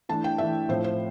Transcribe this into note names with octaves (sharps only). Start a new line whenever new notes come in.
E3 A3 D4 A5
G5
E3 A3 D4 E5
A2 F3 A3 C4 C5
C5